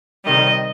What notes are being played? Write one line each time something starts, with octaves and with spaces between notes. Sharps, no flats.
C3 D#3 G3 D#5